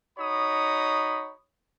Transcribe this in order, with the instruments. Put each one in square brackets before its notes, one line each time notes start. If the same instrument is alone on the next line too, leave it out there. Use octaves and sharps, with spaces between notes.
[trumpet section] D#4 F#4 C#5 B5 D#6